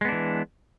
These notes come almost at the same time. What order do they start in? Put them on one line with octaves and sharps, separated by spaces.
G#3 B3 D4 E3